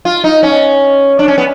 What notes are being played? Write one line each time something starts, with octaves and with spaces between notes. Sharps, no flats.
F4
D#4
C#4
D4
C#4
B3